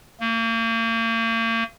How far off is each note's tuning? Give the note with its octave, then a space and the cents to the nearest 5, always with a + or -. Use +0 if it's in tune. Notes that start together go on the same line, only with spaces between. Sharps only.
A#3 -40